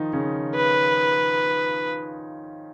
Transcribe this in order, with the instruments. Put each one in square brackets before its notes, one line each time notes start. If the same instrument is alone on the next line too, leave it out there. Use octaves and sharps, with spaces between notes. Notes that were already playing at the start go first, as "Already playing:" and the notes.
Already playing: [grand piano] D#3 F3 D#4 F4
C#3 C#4
[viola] B4